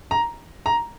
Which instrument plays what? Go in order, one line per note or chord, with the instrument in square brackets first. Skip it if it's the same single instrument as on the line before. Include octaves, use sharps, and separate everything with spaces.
[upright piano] A#5
A#5